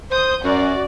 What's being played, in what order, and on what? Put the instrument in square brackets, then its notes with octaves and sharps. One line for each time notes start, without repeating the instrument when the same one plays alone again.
[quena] C5 [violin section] D#6 G6
[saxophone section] F#2 [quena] F#4 [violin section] D5